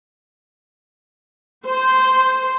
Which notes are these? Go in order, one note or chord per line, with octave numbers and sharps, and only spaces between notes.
C5